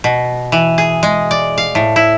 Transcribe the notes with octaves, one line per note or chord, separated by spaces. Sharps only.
B2
E3
G#4
G#3
D5
F5
A2
E4